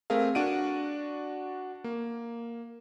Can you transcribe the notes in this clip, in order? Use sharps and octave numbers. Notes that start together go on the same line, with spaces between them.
A3 C4 G#4 A#4 F5
D4 F#4 D5 F#5 D7 D#7
A#3